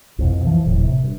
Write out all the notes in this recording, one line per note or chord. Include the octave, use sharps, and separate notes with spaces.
C2 F2 B2
E3 F3
D#1 A2
C3
G2